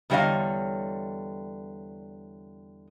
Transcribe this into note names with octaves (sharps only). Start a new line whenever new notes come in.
E2 D3 G3 C#5 D#5 F5